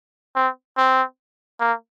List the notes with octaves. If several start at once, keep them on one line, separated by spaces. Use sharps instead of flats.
C4
C4
A#3